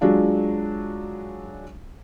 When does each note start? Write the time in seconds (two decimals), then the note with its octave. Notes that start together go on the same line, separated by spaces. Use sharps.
0.01 F#3 G#3 D4 F4